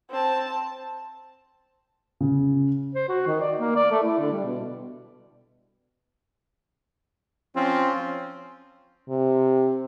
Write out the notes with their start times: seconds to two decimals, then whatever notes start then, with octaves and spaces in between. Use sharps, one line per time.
0.10 C4 A5
2.20 C#3
2.95 C5
3.09 F#4
3.27 D#3
3.41 D5
3.58 A#3
3.76 D5
3.91 A3
4.03 E4
4.20 D3
4.32 G3
4.44 B2
7.56 F3 C4 C#4 F4
9.09 C3